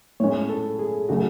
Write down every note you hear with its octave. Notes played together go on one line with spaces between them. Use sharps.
A2 G#3 C#4 C#5
A4
G#4
C#3 F#3 A3 F#4